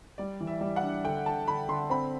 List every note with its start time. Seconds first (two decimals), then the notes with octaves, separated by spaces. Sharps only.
0.18 G3 D5
0.40 E3
0.47 E5
0.61 G3
0.76 F#5
0.83 D4
1.04 D3 G5
1.26 D3 A5
1.47 D3 B5
1.69 D3 C6
1.90 C4 B5